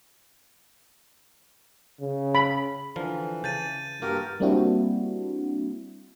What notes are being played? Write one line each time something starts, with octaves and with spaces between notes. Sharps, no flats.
C#3
B5
D3 E3 F3 A#4
C#3 A5 G6 A6 D#7
G2 A#3 F#4 G4 A#4
G3 A#3 C4 D4 E4 F#4